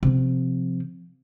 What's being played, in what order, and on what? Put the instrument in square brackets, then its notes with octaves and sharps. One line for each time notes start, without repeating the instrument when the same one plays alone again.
[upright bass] C3 F3